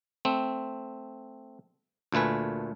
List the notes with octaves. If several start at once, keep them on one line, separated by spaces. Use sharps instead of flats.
A3 C4
D2 A#2 A3 B4 G#5